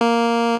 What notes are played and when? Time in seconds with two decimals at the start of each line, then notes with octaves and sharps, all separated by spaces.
0.01 A#3